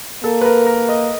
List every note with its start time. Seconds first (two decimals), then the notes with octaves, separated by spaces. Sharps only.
0.24 A#3 A4
0.41 B4
0.45 A#4
0.66 A#4
0.89 D#5